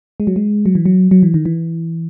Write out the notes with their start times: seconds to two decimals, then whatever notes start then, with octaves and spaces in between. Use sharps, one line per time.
0.20 G#3
0.27 F#3
0.36 G#3
0.66 F#3
0.75 E3
0.86 F#3
1.11 F#3
1.23 E3
1.34 D#3
1.45 E3